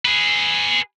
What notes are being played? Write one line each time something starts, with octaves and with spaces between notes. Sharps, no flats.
G#4 B4